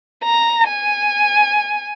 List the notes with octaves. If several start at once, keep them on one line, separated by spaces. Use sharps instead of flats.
A#5
G#5